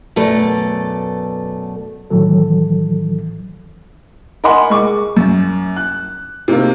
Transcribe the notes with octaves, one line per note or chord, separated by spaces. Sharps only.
F#2 B2 A3 A4 D5
A2 D#3 E3 F#3 A4
A#4 D#5 F#5 G#5 B5 C6
G#3 C#6 D6
F#2
F#6
C3 D#3 A#3